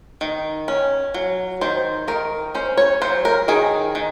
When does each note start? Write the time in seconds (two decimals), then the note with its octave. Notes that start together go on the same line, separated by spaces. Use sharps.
0.21 D#3
0.68 C#4
1.14 F#3
1.61 D#3 C5
2.08 D#3 A#4
2.55 C#4 C5
2.77 C#5
3.02 F#3 C5
3.25 A#4
3.48 D#3 G#4
3.95 D#3